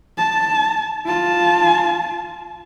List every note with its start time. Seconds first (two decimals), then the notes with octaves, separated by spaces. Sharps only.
0.17 A5
1.06 F4 A5